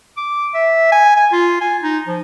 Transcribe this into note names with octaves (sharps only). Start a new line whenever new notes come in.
D6
E5
G#5
G#5
F4
G#5
D#4
F3